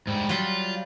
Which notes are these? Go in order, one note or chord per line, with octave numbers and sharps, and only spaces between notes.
G#2 G3
F#3 G3 F4